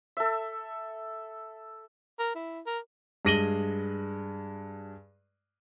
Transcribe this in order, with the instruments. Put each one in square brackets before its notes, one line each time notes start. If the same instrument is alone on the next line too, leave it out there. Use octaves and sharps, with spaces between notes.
[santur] A4 E5
[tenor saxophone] A#4
E4
A#4
[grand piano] G2 G#3 A#6 D#7 F#7 G7